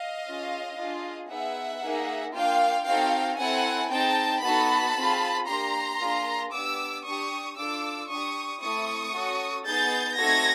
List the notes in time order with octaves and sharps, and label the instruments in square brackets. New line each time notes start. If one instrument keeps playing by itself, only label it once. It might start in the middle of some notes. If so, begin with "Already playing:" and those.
Already playing: [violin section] D#5 F5
C#4 F4 G#4
D4 F4 G#4
B3 D#4 G#4 E5 F#5
A#3 D#4 G#4
A#3 D4 F4 F5 G5
C4 D#4 F#4 A4 F5 G5
C4 E4 A4 F#5 G#5
C4 D#4 G#4 G5 A5
B3 D#4 F#4 A4 A5 B5
C4 F4 G#4
A#3 D4 G4 A#5 C6
A#3 D4 F4 G#4
B3 D4 G4 D6 E6
D4 G4 C#6 D#6
D4 F4 A4 D6 E6
D4 G4 C#6 D#6
A3 C4 E4 A4 C#6 D#6
C#4 F#4 A4
B3 D#4 G#4 G6 A6
A3 C4 D#4 F#4 A4 G#6 A#6